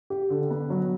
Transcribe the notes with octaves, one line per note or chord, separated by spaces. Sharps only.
G4
D3
B3
F#3